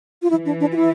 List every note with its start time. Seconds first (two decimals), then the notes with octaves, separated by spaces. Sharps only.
0.22 F4
0.30 E3 E4
0.46 D4
0.61 D4
0.72 F4
0.76 E4